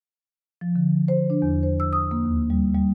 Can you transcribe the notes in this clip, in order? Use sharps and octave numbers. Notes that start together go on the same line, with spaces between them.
F3
D3
C5
D4
E2
C5
E6
D#6
A#3
D#2
G3
G3